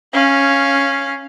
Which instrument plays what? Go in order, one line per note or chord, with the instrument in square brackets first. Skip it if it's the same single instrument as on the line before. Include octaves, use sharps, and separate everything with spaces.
[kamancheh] C#4 F5